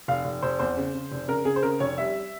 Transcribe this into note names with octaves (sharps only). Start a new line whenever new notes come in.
F1 F5
F1
F1 C5
E2 C5
C#3
C#3
F1
C#3 A#4
C#3 G#4
C5
C#3 A#4
F1 C#5
G3 E5